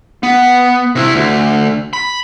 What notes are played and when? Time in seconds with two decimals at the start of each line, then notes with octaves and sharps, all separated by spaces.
0.23 B3
0.95 C3 E4
1.14 D2
1.93 B5